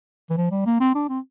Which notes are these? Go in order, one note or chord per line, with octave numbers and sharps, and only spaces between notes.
E3
F3
G3
A#3
C4
D4
C4